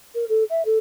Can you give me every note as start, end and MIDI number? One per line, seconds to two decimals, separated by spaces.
0.15 0.25 70
0.29 0.43 69
0.49 0.61 76
0.65 0.78 69